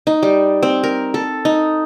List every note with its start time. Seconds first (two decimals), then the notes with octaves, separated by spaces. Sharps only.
0.07 D#4
0.23 G3
0.63 C4
0.83 A#4
1.14 A4
1.45 D#4